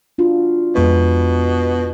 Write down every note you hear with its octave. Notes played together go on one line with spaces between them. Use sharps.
D4 F4 F#4
F2 B2 G#3 B4